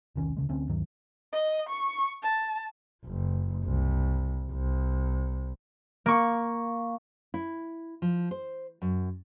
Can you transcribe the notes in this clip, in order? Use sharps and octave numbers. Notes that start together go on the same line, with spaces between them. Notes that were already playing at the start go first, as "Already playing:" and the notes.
E1 C2 D#3 C#4
D2 C#3 G#3
D2 C4 C#4
D2 G2 D#3 F#3
D#5
C#6
A5
F#1
C2
C2
A#3 C#6
E4
F3
C5
F#2